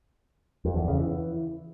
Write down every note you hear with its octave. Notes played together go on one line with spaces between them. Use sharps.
F2
E2
C#3
E3